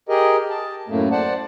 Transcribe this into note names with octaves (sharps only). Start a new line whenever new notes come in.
G4 G#4 A#4 D#5
A5
F#2 A2 A3 A#3
C5 D5 F#5 A5